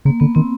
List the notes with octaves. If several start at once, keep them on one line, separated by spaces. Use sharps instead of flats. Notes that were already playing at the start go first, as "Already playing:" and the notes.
C#3 A#3
D3 B3
D#3 C4